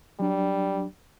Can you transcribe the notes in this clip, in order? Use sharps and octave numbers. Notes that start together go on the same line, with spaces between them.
F#3 G3 D4